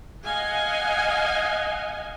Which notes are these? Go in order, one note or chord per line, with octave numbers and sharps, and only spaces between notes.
D#5 F5 F#5 G#5